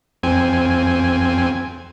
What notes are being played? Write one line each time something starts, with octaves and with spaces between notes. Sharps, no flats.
F2 C4 G#5